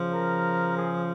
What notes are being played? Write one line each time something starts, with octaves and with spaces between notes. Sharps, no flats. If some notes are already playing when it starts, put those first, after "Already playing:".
Already playing: C#3 F3
A#4
G#4